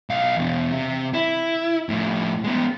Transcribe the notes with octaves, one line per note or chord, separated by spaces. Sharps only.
B1 F5
E2 B2
C3
E4
A2 F3
G#3 B3